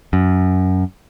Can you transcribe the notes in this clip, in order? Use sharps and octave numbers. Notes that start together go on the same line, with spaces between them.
F#2